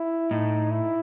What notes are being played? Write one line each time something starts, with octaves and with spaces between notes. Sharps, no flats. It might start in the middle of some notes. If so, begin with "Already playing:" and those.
Already playing: E4
A2 D#4
E4